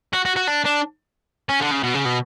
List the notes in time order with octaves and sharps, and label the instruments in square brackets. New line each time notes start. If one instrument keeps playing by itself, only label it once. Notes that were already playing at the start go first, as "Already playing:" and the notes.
[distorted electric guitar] F#4
F#4
F#4
D4
D4
C#4
D3
C#3
B2
C#3
B2